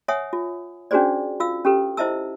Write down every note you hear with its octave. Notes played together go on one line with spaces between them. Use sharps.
C#5 E5 F#5 G#5 D#6
F4
C#4 D4 F#4 G#4 C5 D5
F4 F5 E6
C#4 G4 A4 B4
E4 C5 D#5 E5 A5 E6